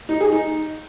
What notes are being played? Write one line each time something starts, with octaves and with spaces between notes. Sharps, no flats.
D#4
G#4
D#4